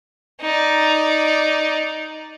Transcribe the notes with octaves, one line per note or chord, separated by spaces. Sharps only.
D#4 D5